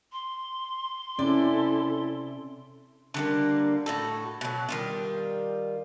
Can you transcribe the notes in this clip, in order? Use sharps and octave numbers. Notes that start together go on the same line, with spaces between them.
C6
C3 C#4 E4 A4 D5
D3 G3 A#3
A2 F#4 A4
B2 F#3
D#3 G3 F4